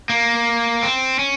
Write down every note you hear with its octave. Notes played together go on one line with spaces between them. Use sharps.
A#3
C4
C#4